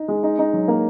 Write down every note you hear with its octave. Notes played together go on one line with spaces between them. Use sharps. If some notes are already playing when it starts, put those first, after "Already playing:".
Already playing: D#4
G#3
D#4
D#4
F#3
A#3